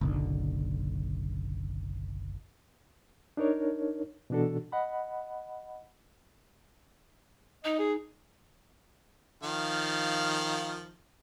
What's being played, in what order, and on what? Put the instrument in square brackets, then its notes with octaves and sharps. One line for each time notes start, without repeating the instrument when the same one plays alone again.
[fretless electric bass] F#1 B1 D3
[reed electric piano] D4 D#4 A#4 C#5
B2 E3 D4 F#4 A4
D#5 F#5 B5
[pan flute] D#4 [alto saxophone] D#5
[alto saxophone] G#4
[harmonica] D#3 F3 F5